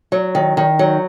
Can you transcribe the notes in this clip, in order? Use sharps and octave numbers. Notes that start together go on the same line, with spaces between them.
F#3
D#3
D#3
F#3